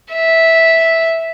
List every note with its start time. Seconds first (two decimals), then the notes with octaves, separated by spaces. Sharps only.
0.13 E5